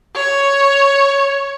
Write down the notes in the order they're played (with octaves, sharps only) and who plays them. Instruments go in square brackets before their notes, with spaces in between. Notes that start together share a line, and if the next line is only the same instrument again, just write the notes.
[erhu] C#5